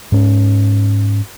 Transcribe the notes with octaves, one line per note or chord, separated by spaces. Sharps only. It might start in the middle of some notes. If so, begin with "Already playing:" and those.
G#2 C#4